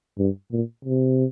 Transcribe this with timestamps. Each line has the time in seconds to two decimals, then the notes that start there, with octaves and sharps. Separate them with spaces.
0.18 G2
0.52 A#2
0.85 C3